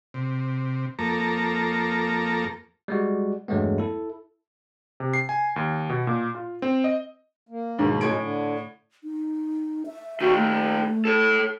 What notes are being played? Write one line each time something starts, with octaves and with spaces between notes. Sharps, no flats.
C3
F2 A#3 A4 A#5
G3 G#3 F#4
E2 G2 F#3 G#3 A3 B3
E4 A4
C3
C7
G#5
D#2
B2
A#2
F4
C4
D#5
A#3
D#2 G#2 B2
A2 F#3 C#4 D#4 G#6 D7
D3
D#4
E5
A#2 D#3 F#4
A3
A4 C#5